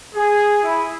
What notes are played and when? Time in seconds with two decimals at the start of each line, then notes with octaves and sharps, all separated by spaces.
0.15 G#4
0.63 E4